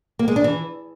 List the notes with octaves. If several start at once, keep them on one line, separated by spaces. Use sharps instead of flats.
A#3
G#3
D4
E3